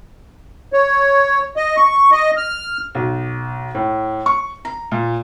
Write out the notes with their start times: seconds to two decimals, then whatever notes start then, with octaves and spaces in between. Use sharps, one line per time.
0.73 C#5
1.57 D#5
1.77 C#6
2.12 D#5
2.37 F6
2.95 B1
3.75 A2
4.26 C#6
4.65 A#5
4.92 A#2